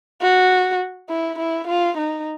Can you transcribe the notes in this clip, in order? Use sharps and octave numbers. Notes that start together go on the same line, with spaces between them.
F#4
E4
E4
F4
D#4